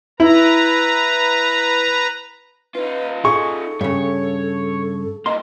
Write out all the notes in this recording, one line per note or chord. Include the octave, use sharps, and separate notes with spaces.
E4 B4 A#5
D#4 F4 B4
G#4 A4 C#6
G2 C#3 C#5
G2 A#3 D#5 C6